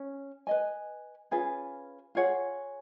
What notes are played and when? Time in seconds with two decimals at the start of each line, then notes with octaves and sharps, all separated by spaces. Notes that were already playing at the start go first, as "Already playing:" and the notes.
Already playing: C#4
0.47 B4 D#5 G#5
1.31 C#4 F4 G#4 B4
2.15 F4 G#4 C#5 F#5